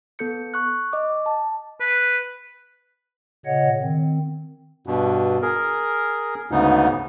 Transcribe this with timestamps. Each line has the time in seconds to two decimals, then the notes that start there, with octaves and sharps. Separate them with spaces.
0.19 B3 A4 G6 C#7
0.54 C#6 F#6
0.93 D#5 D6
1.26 A5
1.80 B4
3.46 A#2 C#3 C#5 D#5 F#5
3.81 D#3 C4
4.87 G2 B2
5.42 G#4 A#4
6.51 D2 G#2 C#3 B3 D#4